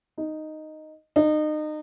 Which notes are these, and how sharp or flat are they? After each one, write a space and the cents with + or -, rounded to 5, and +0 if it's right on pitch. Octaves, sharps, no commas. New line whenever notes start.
D#4 -5
D#4 -30